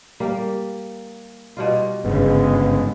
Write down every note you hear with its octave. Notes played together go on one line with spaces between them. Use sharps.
G3 A#3
B2 G3 F4
G1 G#2 C#3 G#3 B3